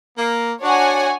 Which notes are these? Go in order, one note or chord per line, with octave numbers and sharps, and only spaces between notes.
A#3
D4 F#4 C#5 F#5 G#5